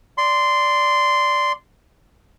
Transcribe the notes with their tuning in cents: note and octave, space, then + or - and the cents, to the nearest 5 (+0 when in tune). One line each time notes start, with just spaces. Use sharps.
D5 +0 C6 -10